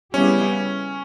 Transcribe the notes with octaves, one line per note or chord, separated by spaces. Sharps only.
C#3 G3 B3 C#4 E4 G4